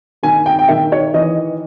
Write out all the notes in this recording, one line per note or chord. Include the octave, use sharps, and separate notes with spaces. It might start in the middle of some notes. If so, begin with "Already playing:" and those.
D#3 G#5
G5
G5
D#3 E5
C#5
E3 D#5